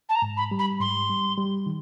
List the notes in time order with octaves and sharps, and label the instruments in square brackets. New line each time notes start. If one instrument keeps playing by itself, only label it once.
[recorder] A5
A#5
[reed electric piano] G#2
[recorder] B5
[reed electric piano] G3
[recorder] B5
[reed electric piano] G#2 [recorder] C6
[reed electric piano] G3
G3
D#3